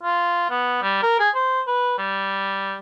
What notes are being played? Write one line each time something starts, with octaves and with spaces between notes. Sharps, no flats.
F4
B3
G3
A#4
G#4
C5
B4
G3